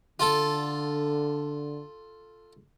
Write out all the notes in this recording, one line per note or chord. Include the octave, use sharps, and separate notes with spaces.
D3 F4 A4